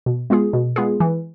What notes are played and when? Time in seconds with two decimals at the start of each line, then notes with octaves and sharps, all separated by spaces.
0.06 B2
0.30 G#3 B3 F4 G#4
0.53 B2
0.76 G#3 B3 F4 G#4
1.00 E3